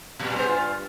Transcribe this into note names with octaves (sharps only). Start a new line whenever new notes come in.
A#2 G3
B3 G#4 C5
G2 F4